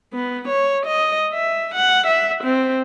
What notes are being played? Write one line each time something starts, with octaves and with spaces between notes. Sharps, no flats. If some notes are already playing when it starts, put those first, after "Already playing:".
B3
C#5
D#5
E5
F#5
E5
C4